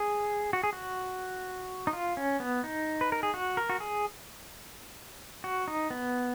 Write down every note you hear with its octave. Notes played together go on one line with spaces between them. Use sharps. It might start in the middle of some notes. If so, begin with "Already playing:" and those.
Already playing: G#4
F#4
G#4
F#4
D#4
F4
C#4
B3
D#4
B4
A#4
G#4
F#4
A#4
F#4
G#4
F#4
D#4
B3